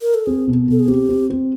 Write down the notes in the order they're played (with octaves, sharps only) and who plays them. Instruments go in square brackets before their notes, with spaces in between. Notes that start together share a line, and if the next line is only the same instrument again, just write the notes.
[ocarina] A#4
A4
[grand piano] C4 [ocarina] G#4
[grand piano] B2
[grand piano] B2 [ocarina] A4
[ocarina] G#4
[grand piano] C4 [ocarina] G4
[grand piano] C4
C4